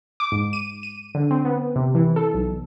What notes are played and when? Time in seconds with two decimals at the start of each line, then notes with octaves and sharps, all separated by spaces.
0.20 D6
0.32 G#2
0.53 D#7
0.83 D#7
1.15 D3
1.31 C4
1.45 B3
1.76 C3
1.95 E3
2.16 A4
2.34 B1